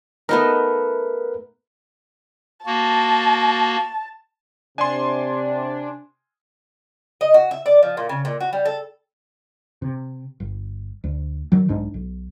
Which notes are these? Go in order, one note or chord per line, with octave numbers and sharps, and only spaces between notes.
A3 B3 D#4 A#4 B4
A#3 F#4 A5
C3 D4 G#5 C6
D#5
F#4
E5
D5
F3
A#2
C#3
A#2
F#4
G3
A4
C3
G1
D2
D#3 F#3
B1 G#2 D4
B1